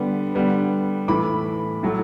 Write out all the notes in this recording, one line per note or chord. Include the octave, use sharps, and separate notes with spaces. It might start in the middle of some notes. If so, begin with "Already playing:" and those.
Already playing: D3 G3 B3
D3 G3 B3
A2 E3 A3 B5 D6
A2 F#3 A3